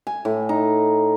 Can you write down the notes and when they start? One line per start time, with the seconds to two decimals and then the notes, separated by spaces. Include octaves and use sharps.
0.07 G#5
0.25 A2
0.49 D#4